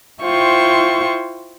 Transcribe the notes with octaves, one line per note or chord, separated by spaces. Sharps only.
E4 F4 C5 G5 C#6